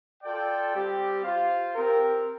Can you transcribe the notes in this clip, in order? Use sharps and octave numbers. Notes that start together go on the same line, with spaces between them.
F4 A4 D5 G5
G3 C4 G4
F4 C5 F5
C4 G4 A#4